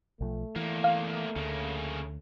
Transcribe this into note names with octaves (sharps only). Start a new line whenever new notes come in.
B1 F3 A3
E2 E3 A#3
F5
D2 C#3 A#3